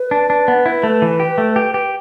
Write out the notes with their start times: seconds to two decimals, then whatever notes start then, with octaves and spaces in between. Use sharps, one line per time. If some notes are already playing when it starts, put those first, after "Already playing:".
Already playing: B4
0.11 D4
0.30 D4
0.48 B3
0.66 E4
0.83 A3
1.02 E3
1.20 G4
1.38 A3
1.56 G4
1.74 G4